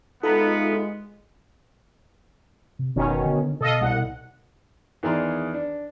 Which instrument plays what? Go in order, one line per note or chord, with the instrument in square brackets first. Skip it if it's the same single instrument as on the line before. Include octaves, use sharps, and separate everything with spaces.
[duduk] G#3 [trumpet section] B3 [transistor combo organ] D#4 F4 [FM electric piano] A4 E5 A#5
[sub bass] C3
[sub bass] F#1 [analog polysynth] B2 D#3 C#4
[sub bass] D3
[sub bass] B2 [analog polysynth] A4 D#5 F5
[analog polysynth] C2 F#5
[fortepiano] E2 D#3 G#4 D5 A#5 C6
D4